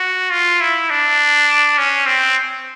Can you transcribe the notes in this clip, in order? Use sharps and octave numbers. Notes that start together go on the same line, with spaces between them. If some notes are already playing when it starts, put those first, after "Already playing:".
Already playing: F#4
F4
E4
D4
C#4
C4